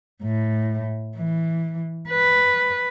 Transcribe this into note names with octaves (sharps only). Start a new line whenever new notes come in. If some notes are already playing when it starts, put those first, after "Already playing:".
A2
E3
B4